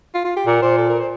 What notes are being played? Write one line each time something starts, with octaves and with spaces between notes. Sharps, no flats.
F4
F4
G4
A#2 A#4
A#2 C5
A4
A#4
C5